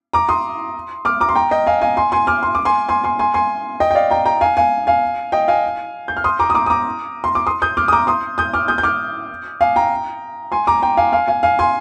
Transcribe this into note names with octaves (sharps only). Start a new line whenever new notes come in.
A#5 D6
C6 D#6
D6 F6
A#5 D6
C6
G5 A#5
D#5 G5
F5 G#5
F5 G#5
G#5 C6
G#5 C6
D6 F6
C6
D6
G#5 C6
G#5 C6
G#5 C6
G#5 C6
G#5 C6
D#5 G5
G5
D5 F5
G5 A#5
G5 A#5
F5 G#5
F5 G#5
F5 G#5
D#5 G5
F5 G#5
G6
F6
C6 D#6
A#5 D6
D#6
A#5 D6
D#6
A#5 D6
C6
D6
C6 D#6
D#6 G6
D6 F6
D#6
A#5 D6
C6 D#6
D#6 G6
D6 F6
D#6 G6
G6
D6 F6
F5 G#5
G5 A#5
G#5 C6
A#5 D6
G5 A#5
F5 G#5
F5 G#5
F5 G#5
F5 G#5
G#5 C6